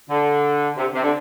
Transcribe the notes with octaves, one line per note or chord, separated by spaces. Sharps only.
D3
C3
C3
D3